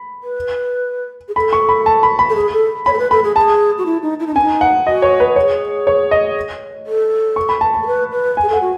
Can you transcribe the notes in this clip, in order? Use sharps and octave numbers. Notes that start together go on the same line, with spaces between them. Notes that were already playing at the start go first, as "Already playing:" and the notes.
Already playing: B5
B4
G#4
A4 B5
C#6
B5
A5
B5
B5
A4
G#4
A4
C#5 B5
A4
B4
A4 B5
G#4
G#4 A5
F#4
E4
D#4
E4
D#4
C#4 G#5
D#4
F#5
F#4 D#5
C#5
B4
G#4 C#5
C#5
D#5
A4
C#6
B5
A5
A5
A4
B4
B4
G#5
G#4
A4
F#5
F#4